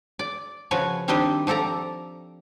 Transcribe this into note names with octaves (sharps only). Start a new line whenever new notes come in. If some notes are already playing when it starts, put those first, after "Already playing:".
D5
C#3 F3 F#4 B4 C#5
D#3 G3 C4 D4 G4 D#5
F3 G4 A4 D5 A#5